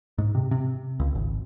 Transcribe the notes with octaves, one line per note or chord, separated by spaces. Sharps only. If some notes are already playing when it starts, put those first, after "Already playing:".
G#2
C3
C3
C#2
G#1